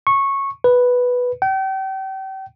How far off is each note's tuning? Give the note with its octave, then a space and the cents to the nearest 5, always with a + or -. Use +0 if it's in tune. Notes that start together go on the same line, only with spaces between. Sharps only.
C#6 -15
B4 +0
G5 -35